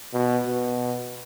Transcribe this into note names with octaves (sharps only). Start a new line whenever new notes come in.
B2
B2